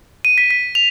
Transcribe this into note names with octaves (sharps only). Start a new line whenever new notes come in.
D#7
B6
B6
F7